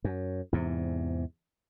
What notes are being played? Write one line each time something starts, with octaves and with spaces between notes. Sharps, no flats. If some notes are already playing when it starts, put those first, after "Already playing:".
F#2
E2 G#2 C3